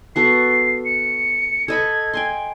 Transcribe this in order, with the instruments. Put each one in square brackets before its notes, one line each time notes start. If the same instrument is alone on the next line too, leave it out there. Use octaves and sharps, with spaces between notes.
[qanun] B3 F#4 A4 [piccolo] C7
[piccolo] C#7
[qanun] A4 D#5 B5 [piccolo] G#6
[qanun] G5 G#5 C6